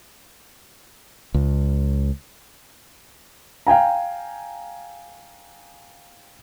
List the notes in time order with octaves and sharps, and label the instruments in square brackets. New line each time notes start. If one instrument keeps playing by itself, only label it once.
[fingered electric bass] C#2
[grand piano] F5 G5 G#5 A#5